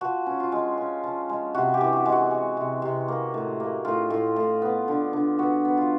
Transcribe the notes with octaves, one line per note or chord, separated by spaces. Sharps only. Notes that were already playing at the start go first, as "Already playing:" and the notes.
F3 F#4
C#4
F4
G#3
C#4
F3
G#3
C3 F#4
G4
E3
F#4
G#3
F#4
G#3
C3
C3
A#3
A2
A#3
A2 F4
A2
A2
B3
D3
D3
B3 F#4
B3
F4